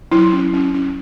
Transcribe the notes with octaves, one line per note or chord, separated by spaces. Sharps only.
F#3 E4
C#4
C#4
C#4